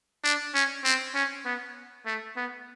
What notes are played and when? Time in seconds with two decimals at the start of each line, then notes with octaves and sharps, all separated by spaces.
0.24 D4
0.55 C#4
0.84 C4
1.15 C#4
1.45 B3
2.06 A3
2.36 B3